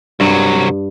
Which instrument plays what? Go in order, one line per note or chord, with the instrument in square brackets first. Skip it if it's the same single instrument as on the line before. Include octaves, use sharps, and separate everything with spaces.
[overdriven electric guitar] C2 F#3 [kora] G2